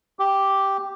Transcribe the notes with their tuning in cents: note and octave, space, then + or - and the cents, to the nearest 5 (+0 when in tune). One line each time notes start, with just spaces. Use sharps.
G4 -5